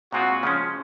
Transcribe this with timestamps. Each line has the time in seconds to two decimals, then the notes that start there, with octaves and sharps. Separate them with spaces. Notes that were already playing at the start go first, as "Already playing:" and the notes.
0.13 A#2 G#3 C4 F4 F#4
0.43 C#3 F3 G#3 C#4